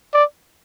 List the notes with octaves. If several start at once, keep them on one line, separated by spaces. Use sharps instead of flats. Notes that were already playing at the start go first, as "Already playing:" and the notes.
D5